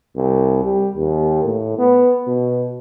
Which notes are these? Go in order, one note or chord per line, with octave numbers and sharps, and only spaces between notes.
C2
G3
D#2
A2
B3
B2